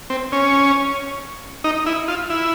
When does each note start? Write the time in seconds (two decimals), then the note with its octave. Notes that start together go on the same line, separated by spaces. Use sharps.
0.10 C4
0.32 C#4
1.64 D#4
1.86 E4
2.08 F4
2.30 E4